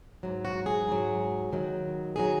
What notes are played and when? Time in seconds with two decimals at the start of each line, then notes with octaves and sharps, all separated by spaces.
0.23 G#2 F#3
0.45 F#4
0.66 G#4
0.87 G#2 F#3
1.52 D#2 D#3 F#3
2.16 D#3 F#3 G#4